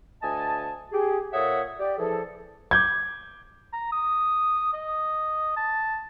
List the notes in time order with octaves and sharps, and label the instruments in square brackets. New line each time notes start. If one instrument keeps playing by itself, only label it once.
[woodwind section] D2 D#5 G#5 A5
G4 G#4
A#2 A4 C#5 E5 F#5 D#6
G4 D5
E3 F3 G#4 A4
[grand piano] D6 G6 G#6
[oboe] A#5
D#6
D#5
A5